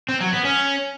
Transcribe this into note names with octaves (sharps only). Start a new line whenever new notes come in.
C4
F#3
B3
C#4